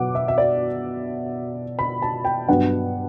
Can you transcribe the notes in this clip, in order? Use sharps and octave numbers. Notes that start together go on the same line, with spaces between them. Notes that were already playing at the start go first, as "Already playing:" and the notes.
Already playing: B2 F#3 B3 F#5 D6
E5
E5
D5
B5
A5
G5
G2 F#3 B3 D4 F#5